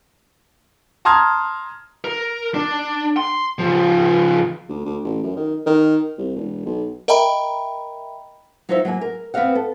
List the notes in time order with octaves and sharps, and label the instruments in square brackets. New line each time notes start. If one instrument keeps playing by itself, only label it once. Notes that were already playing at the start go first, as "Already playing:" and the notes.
[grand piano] A5 A#5 C6 D#6 F6 G#6
[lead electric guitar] A#4
D4
C6
C#3 F3
[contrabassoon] D2
D2
A1
F#2
D#3
D#3
C2
E1
B1
[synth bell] A#4 D#5 E5 G5 A#5 B5
[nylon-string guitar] F#3 D#4 F4 C5 D5 E5
F#3 A#3 G#5
A#4
B3 C4 B4 D#5 F5 F#5
A4